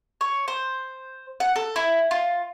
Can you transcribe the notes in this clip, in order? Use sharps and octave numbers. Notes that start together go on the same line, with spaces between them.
C#5
C5
F#5
A4
E4
F4